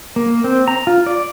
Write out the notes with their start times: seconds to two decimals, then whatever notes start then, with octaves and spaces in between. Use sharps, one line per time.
0.16 A#3
0.44 C4
0.68 A#5
0.87 F4
1.07 D5